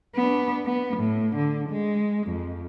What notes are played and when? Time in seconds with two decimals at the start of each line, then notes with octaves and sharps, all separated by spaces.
0.15 B3 D4
0.66 B3
0.97 A2
1.36 D3
1.69 G#3
2.27 F2